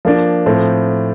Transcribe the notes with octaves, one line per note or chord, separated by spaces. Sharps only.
F3 A#3 D4
A2 F3 C4